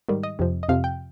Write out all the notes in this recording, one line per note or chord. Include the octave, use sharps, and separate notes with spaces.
G#2 D#3 G3
D#5
F2 C3 F3
D#5
F2 C3 F3 F5
G5